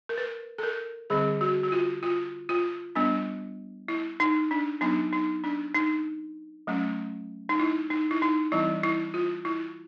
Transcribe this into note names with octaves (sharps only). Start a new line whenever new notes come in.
A#4
B4
A4
A#4
D3 G3 C4 G#4
F#4
F#4
F4
F4
F4
G3 B3 D4
E4
D#4
D4
F#3 B3 D4 D#4
D#4
D4
D#4
F#3 A3 C#4
D#4
E4
D#4
E4
D#4
E3 G3 C4 E4
E4
F4
E4